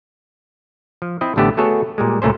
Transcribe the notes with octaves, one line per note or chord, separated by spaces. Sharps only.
F3
C4 E4 D#5
A1 A2 D3 A3 B3 G4
A3 B3 F#4 G#4 A4 C#5
A#2 G3 G#3
C#2 A#2 A3 C#4 C5